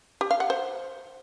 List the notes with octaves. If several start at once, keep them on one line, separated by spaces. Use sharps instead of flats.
G4
F5
F#5
C5